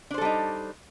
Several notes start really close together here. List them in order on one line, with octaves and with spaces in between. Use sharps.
D4 C5 A4 G3 D#4